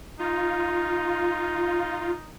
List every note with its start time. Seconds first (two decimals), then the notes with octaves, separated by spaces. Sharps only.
0.19 D#4 F4